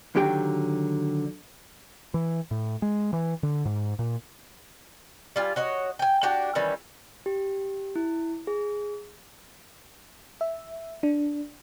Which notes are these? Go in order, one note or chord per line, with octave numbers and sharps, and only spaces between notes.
D3 D#3 F#3 G4 G5
E3
A2
G#3
E3
D3
G#2
A#2
G3 F4 G#5
F#4 C#5 D#5
G5 G#5
D4 F#4 G4
D#3 E3 G3 C#4
G4
E4
G#4
E5
D4